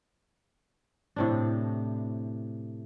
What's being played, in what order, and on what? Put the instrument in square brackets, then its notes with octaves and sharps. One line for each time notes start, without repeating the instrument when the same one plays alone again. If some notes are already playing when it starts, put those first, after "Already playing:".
[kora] A2 C3 D4